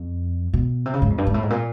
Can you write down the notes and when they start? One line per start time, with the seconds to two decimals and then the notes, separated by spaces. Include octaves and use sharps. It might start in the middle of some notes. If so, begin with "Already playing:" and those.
Already playing: F2
0.54 B2
0.86 C3
0.94 C#3
1.02 G#2
1.10 F2
1.18 G2
1.27 G#2
1.34 A2
1.43 G#2
1.50 A#2